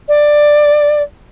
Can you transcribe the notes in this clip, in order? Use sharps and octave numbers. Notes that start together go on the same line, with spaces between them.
D5